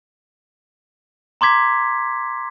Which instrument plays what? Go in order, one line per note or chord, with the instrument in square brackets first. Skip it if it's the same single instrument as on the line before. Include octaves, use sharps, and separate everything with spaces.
[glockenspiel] A#5 C6 D6 G#6 B6